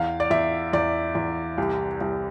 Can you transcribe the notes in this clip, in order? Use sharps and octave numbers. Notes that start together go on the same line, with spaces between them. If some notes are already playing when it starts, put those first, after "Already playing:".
Already playing: E2 F5
D5
E2 E5
E2 D5
E2
C2
C2